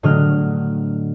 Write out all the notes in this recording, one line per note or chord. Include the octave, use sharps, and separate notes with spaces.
A2 D3 F#3 D#5 F6